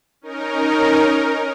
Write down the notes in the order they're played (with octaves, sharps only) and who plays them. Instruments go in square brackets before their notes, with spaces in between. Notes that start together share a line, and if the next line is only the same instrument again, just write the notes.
[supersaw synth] C#4 D#4 A#4